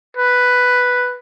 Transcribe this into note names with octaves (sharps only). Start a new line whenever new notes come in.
B4